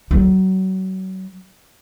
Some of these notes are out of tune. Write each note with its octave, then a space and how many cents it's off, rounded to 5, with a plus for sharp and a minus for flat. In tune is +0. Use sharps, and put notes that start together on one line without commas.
F#3 +30